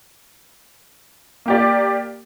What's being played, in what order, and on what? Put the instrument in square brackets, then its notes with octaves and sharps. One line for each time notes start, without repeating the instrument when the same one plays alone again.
[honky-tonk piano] A#3 G4 D5